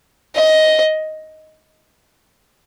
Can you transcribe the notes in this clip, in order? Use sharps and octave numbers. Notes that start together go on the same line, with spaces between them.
D#5